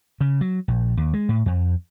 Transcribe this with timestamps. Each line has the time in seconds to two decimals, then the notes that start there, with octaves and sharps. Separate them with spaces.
0.21 C#3
0.41 F#3
0.68 A#1
0.97 D#2
1.14 G#3
1.29 A2
1.46 F2